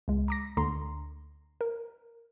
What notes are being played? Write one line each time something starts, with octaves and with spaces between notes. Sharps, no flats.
C#2 G#3
A#5 D6 A#6
D2 D3 A#5 C6
A#4